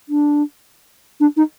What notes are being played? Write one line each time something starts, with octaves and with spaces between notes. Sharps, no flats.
D4
D4
D#4